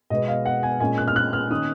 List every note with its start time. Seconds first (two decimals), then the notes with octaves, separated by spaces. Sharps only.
0.10 B2 G#3 B3 D#5
0.28 F5
0.46 F#5
0.63 G#5
0.80 A#2 G#3 C#4 G#5
0.98 F#6
1.08 F6
1.16 F#6
1.33 F6
1.51 D#3 A#3 C#4 D#6